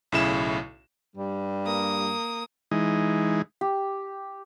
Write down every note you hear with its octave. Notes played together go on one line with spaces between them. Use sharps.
B1 A2 C#3 E4 E7
G2 G3
A#3 D#6
E3 G#3 D#4
G4